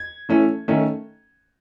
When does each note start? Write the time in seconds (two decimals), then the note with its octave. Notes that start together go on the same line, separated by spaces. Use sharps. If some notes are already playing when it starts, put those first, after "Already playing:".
Already playing: G#6
0.29 E3 A3 C#4
0.68 D#3 A3 C#4